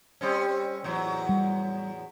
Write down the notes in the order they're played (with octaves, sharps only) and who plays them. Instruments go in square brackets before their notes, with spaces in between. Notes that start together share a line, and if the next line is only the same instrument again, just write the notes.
[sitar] G3 C4 C#4
E2 A2 F#3
[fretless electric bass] G3